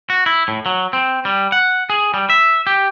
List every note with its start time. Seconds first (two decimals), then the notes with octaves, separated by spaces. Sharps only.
0.10 F#4
0.26 E4
0.48 A2
0.66 F#3
0.93 C4
1.25 G3
1.52 F#5
1.90 G#4
2.14 G3
2.30 E5
2.67 G4